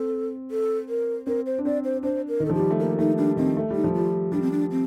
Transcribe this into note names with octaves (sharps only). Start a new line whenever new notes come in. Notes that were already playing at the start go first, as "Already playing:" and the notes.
Already playing: C4 A4
A4
A#4
C4 A#4
C5
D4
C4 D5
C5
D4 C5
A#4
D#3
A4
F3 G4
G3
A3
A#3 G4
A3 D#4
G3 D4
D#3 C4
A3
G3 D#4
F3
G3 F4
G3 D4
C4
D4
C4